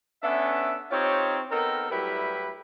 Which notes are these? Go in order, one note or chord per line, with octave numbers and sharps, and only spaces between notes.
B3 C#4 D4 A4 E5
C4 D#4 F4 G4 C#5
B3 C4 D#4 A4 A#4
A2 F#3 G3 E4 G4 B4